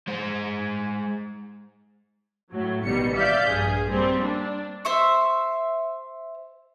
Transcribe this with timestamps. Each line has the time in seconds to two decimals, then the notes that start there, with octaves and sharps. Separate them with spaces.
0.08 G#3 C5
2.52 A2 F#3
2.84 A1 B2 D#3 G3 C#7
3.14 D5 E5 F5 F6 G6
3.49 A#1 G2 G#4
3.90 G3 A#3 C4
4.22 D4
4.85 C5 E5 C#6